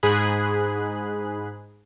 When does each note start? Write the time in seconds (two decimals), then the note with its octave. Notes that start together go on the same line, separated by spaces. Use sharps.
0.03 G#2 G#4 B5 F#6